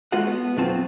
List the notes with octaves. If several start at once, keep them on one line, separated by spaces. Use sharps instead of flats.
G#3 F4 F#4 A4 B4 F#5
B3
B1 F2 F#3 C4 F4 A5